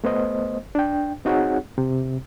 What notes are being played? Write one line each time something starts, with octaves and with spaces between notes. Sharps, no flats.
A3 B3 C5 D#5
D4 G5
C4 D#4 F#4 G#4 C#5 F#5
C3